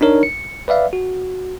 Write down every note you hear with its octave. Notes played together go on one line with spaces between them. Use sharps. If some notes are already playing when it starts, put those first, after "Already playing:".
D4 D#4 A#4 C#5
C#7
B4 D5 E5 F5
F#4